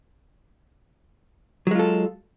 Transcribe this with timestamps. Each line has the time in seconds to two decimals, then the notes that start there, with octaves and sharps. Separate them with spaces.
1.67 F#3
1.71 G#3
1.75 F4
1.79 A4